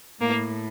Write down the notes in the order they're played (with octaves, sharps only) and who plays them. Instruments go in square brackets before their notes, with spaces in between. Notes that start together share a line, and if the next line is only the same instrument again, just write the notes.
[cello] A2 [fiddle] A#3